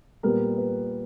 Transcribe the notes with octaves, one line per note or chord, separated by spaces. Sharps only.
A#2 G3 B3 A#4
B4